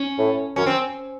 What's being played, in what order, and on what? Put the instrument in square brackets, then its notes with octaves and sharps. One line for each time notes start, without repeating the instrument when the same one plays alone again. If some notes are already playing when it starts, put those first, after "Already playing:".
Already playing: [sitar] C#4
[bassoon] A2
[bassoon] F#2 [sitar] C#4
[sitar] C4